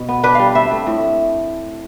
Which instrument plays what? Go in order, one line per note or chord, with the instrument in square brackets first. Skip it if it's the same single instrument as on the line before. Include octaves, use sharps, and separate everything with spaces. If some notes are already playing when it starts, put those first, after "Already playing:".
Already playing: [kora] B2
B3
D4 B4
G3 F5
C4 E5
A3
A2